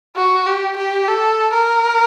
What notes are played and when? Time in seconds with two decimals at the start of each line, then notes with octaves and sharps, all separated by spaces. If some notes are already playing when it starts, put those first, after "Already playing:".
0.16 F#4
0.46 G4
0.77 G4
1.08 A4
1.53 A#4